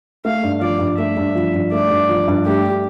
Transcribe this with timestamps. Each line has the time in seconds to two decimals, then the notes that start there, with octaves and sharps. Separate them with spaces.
0.25 A3 F5
0.43 G2
0.61 F3 D5
0.79 G2
0.98 A3 E5
1.17 G2
1.35 F3
1.54 G2
1.72 A3 D5
1.90 G2
2.09 F3
2.28 G2
2.46 A3 G4